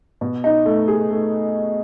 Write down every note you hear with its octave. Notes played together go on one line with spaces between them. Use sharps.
B2
D#4
A3
G#4
A3